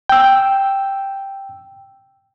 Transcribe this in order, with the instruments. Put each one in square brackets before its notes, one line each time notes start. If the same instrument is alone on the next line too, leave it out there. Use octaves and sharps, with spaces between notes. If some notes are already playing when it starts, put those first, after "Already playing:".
[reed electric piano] G5 E6